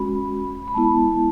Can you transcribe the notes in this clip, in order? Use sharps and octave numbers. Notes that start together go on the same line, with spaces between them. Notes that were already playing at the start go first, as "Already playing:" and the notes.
Already playing: G#3 C#4 F#4 B5
B5
G#3 B3 E4 A5